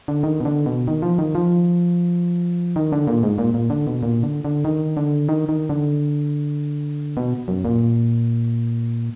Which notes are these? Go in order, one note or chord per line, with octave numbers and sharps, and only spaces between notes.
D3
D#3
B2
D3
B2
D#3
F3
D#3
F3
D#3
D3
A#2
G#2
A#2
A#2
D3
B2
A#2
D3
D3
D#3
D3
D#3
D#3
D3
B2
F#2
A#2